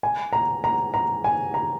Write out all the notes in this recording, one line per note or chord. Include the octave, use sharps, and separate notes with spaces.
G#5
A#5
A#5
A#5
G#5
A#5